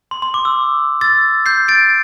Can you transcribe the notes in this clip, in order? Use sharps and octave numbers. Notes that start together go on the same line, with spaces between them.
C6
C6
D6
E6
E6 A6
G6 C7
A6 D7